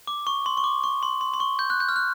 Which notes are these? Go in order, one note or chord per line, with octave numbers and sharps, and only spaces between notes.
D6
C#6
C6
C#6
D6
C#6
C6
C6
C6
C#6
G6
F#6
G6
F6
F#6